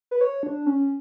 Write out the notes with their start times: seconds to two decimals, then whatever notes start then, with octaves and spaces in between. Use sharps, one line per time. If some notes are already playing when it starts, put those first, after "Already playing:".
0.11 B4
0.21 C#5
0.43 D4
0.66 C#4